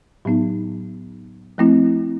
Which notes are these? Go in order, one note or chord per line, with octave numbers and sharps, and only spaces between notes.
A2 F#3 B3 D#4
F3 A3 C4 E4